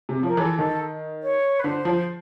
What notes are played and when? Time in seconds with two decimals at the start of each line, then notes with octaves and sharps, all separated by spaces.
0.09 C3
0.23 F3 A#4
0.37 E3 A4
0.58 D#3 A4
1.22 C#5
1.59 B4
1.64 D3 C5
1.85 F3